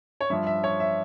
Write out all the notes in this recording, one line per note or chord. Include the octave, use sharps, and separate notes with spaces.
C#5
G2 F3 E5
E5
C#5
E5